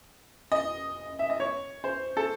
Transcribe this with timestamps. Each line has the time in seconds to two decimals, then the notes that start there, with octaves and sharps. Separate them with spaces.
0.52 D#5
1.19 E5
1.30 D#5
1.40 C#5
1.84 C5
2.17 A4